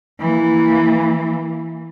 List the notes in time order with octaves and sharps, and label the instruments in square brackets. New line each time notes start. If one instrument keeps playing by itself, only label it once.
[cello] E3 A#3